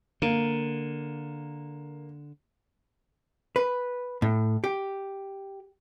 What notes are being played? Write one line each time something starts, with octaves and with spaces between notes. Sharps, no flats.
D3 A#3
B4
A2
G4